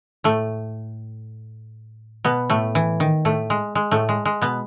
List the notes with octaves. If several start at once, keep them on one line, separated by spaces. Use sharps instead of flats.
A2 A3
B2 B3
A2 A3
E3
D#3
A2 A3
G#3
G#3
A2 A3
G#3
G#3
B2 B3